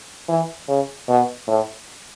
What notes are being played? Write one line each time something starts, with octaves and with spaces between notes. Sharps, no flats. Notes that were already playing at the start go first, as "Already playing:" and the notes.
E3
C#3
B2
A2